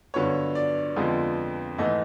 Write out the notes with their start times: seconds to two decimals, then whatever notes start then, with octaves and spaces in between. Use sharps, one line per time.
0.14 G2 D3 F#3 B3 C#5
0.55 D5
0.96 F2 D3 F3 G#3 B3
1.78 G#2 E3 A3 D#5